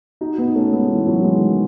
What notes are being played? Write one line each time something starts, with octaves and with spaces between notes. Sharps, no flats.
D#4 F#4
B3 D#4
A3 C#4
G#3 B3
E3
D#3 F#3
E3 G#3
D#3